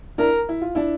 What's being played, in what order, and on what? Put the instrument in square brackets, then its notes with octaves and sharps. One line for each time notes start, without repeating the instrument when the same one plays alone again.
[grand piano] D4 E4 [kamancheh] A#4
[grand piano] E4
F4
D4 E4